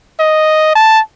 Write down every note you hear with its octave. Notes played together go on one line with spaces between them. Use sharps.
D#5
A5